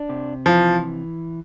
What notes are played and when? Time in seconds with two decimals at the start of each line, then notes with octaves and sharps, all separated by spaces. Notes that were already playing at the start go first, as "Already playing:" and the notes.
Already playing: D4
0.09 C3
0.46 E3 F3